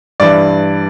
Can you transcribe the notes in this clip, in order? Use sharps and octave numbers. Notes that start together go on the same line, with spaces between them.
G2 E3 D5